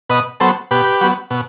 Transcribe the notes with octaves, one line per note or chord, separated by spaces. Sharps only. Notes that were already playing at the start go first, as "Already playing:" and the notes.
B2 B4 D#5
F#3 B3 A4 C5
B2 G4 B4
F#3 B3
B2